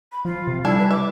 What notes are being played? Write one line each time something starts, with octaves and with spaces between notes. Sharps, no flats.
B5
F3 F4
C3
G3 D4 E4 A4 G#5
B4
E5 D6